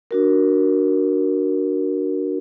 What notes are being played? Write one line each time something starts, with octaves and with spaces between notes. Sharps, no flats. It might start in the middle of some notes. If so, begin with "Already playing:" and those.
D4 F#4 A#4